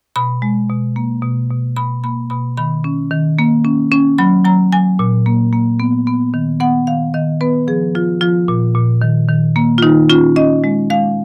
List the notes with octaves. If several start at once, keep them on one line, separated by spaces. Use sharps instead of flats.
B2 B5
G#3
B2
A#3
B2
B2
B2 B5
A#3 B5
B2 B5
D#3 B5
C#4
D#3
A#3
C#4
C#4
F#3 B5
F#3 A#5
F#3 G#5
A#2
A#3
A#3
B3
B3
D#3
B3 F#5
D#3 F5
D#3 D#5
B3 B4
F3 G#4
F3 F4
F3 F4
A#2
A#2
D#3
D#3
A#3
F4
D#3 D#4
C#4 F4
C#4 D#5
G#3
G#3 F5